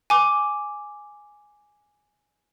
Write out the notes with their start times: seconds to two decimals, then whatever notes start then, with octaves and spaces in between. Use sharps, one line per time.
0.10 G#5 D6